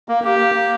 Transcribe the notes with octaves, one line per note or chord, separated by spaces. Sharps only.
A#3
A#3 G4
A#3
A#3